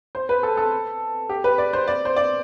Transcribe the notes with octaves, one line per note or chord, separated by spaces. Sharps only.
C5
B4
A4
A4
G4
B4
D5
C5
D5
C5
D5